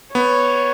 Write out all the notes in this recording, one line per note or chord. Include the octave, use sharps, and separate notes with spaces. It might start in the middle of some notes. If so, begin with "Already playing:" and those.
B3 C#5